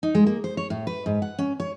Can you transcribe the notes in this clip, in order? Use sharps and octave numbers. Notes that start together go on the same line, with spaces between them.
D#4
G#3
A#3
C5
C#5
A2
B4
G#2
F#5
C#4
C#5